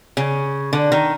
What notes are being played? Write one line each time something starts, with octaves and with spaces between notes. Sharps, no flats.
C#3
D3
D#3